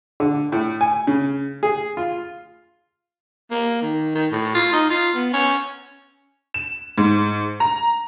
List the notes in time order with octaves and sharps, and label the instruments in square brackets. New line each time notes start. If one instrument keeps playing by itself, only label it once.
[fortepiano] D3
A2
G#5
C#3
G#4
F4
[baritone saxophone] A#3
D#3
D#3
A2
F4
D#4
F4
B3
C#4
[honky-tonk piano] E7
G#2
A#5